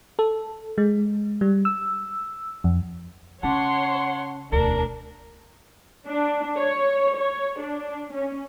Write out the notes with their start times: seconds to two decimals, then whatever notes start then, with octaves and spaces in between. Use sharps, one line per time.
0.19 A4
0.78 G#3
1.41 G3
1.65 E6
2.64 F2
3.43 C#3 C#4 C#5 F#5 A5 C6 C#6
4.52 E1 D2 D4 A#4
6.07 D4
6.57 C#5
7.17 C#5
7.59 D4
8.13 C#4